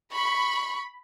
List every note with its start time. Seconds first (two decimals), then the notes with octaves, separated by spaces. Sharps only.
0.13 B5 C#6